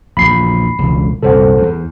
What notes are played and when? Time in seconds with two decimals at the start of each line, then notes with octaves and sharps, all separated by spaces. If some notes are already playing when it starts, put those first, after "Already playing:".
0.17 A#1 E2 B5 C7
0.79 E1 C#2
1.23 C2 F#2 A#2 A4 C5 F#5
1.57 E2